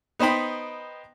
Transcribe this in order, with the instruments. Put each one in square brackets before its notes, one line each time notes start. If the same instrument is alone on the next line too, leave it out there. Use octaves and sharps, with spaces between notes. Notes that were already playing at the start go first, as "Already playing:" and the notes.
[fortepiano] B3 D#4 C5 G5 B5